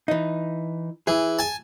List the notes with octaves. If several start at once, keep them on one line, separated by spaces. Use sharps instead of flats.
E3 D#4
E3 G#4
G#5 A5